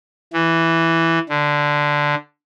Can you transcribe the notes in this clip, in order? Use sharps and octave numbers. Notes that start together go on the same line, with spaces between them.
E3
D3